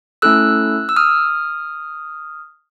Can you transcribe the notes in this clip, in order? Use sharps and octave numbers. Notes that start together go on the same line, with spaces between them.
A3 C#4 E4 A4 E6 F#6
E6
D#6 F6